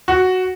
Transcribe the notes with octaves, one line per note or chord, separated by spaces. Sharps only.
F#4